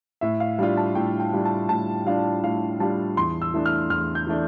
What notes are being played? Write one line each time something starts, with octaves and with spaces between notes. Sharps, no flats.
A2 E5
F5
G3 D4 F4 F5
A5
A2 G5
G5
G3 D4 F4
A5
A2 A5
G3 D4 F4 F5
A2 F5
G3 D4 F4 A5
E2 C6
E6
E3 A3 D4
F6
E2 F6
G6
E3 A3 D4